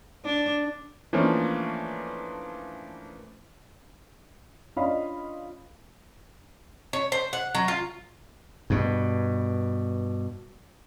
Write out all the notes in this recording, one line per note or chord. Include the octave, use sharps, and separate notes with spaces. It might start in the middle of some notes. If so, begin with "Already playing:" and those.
D4
E3 F3 A3 A#3 C#4 D4
C#4 D4 F4 D#5 F5 B5
C#5
C5
F#5
F#3
F4
G2 B2